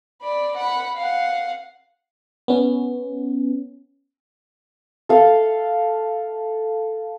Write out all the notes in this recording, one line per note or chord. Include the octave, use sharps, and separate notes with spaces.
D5 B5
F#5 B5
F5 F#5
B3 C#4
A4 F5